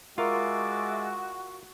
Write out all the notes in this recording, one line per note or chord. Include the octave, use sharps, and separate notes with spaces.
G#3 F4 F#4 A#4 D5 E5